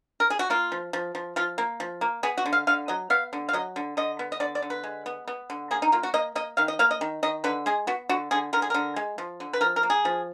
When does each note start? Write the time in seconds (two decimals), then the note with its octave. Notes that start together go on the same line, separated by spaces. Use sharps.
0.20 A#4
0.30 G#4
0.39 F#4
0.50 A#3 F4
0.72 F3
0.93 F3
1.15 F3
1.36 F3 F4
1.58 A#3
1.80 F3
2.01 A#3
2.23 B3 G#4
2.38 F#4
2.46 D3
2.53 F5
2.67 D3 F5
2.88 F#3 D#5
3.10 B3 F5
3.33 D3
3.49 F5
3.53 F#3 D#5
3.76 D3
3.97 D3 D#5
4.19 B3
4.32 D#5
4.40 D3 D5
4.55 D5
4.62 D3
4.70 B4
4.84 G#3
5.06 B3
5.28 B3
5.50 D3
5.71 A#3 G#4
5.82 D#4
5.92 A#3 F4
6.03 F#4
6.14 A#3 D#5
6.35 A#3 D#5
6.57 D#3 F5
6.68 D#5
6.79 A#3 F5
6.91 D#5
7.01 D#3
7.23 D#3 D#5
7.44 D3 B4
7.66 G#3 G#4
7.87 B3 F#4
8.09 D3 F#4
8.31 D3 G#4
8.53 D3 A#4
8.62 G#4
8.70 D3 A#4
8.96 G#3
9.18 F3
9.40 D3
9.53 B4
9.61 F3 A#4
9.76 A#4
9.83 A#3
9.90 G#4
10.05 F3